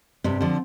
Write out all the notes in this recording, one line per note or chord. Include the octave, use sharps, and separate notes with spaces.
G2 C3 C4
D3 F3